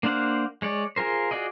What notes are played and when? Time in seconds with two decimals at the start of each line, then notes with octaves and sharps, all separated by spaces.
0.03 A#3 D4 C5 F5 F#5
0.62 G#3 C#5 D5
0.96 F4 G#4 A#4 C5
1.31 F4 F#4 G#4 D5 D#5